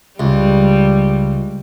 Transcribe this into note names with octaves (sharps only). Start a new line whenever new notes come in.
C#2 G3